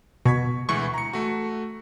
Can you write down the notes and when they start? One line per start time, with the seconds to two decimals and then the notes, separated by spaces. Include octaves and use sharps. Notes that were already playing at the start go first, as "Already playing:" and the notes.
0.25 B2 C#6 G#6 B6
0.69 D2 E3 G#3 C#6
0.94 A#5 C#7
1.13 A3 F#4